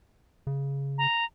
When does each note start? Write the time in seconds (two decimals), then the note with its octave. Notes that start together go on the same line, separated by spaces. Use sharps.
0.47 C#3
0.98 A#5